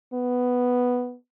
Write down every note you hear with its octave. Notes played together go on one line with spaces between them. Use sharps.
B3